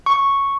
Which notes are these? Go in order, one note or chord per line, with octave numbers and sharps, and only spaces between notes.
C#6